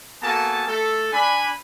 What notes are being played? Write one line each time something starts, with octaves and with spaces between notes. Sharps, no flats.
A#3 B3 F#4 A4 G#5 A5
A3 A4
D4 G#5 B5